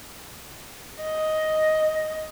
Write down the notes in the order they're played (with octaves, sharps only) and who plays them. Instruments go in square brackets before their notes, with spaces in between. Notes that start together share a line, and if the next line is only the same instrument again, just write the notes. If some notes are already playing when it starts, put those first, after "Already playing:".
[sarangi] D#5